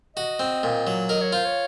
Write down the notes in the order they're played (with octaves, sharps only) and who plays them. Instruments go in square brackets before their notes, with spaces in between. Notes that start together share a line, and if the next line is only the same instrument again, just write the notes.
[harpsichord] F#4 [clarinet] D#5
[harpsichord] C4
A#2
F#3
[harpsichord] A#4 [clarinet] D#5
[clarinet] C#5
[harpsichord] F4 [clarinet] C5
[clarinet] C#5